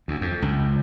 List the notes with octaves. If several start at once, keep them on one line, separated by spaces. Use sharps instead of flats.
D2
F2
C#2